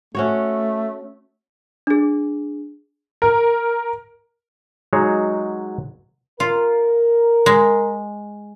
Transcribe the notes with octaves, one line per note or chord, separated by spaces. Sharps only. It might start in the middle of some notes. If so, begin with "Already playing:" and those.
A3 C#4 F#4 C#5
D4 G#4
A#4
F#3 G#3 D#4 F#4 G#4 C#5
F4 A#4
G#3